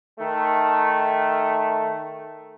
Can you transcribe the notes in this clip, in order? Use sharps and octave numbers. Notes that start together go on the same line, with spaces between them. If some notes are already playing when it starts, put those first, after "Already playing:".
D#3 A3